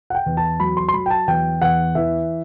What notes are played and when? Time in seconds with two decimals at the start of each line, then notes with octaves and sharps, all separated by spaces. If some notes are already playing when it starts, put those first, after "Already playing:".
0.10 F#5
0.15 G5
0.26 E2
0.37 A5
0.60 F#3 B5
0.77 C6
0.88 C6
0.93 F#3 B5
1.06 G5
1.10 A5
1.27 E2 G5
1.61 E2 F#5
1.95 E3 E5